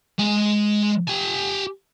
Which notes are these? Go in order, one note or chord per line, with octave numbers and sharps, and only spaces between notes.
G#3 G#5
G4 G#5